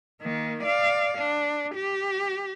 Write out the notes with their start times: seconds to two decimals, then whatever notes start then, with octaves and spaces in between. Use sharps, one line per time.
0.21 D#3 A#3
0.64 D5 F5
1.18 D4
1.75 G4